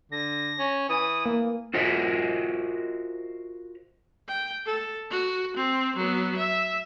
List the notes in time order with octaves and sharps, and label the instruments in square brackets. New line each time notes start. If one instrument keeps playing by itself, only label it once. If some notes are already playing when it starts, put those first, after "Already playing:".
[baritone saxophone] D3 [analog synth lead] A#6
[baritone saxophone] C#4
[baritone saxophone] E3 [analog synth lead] D#6
[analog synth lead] A#3
[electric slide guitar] F4 F#4 A#4 C5 D#5 E5
[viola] G5
A4
F#4
C4
F#3 B3
E5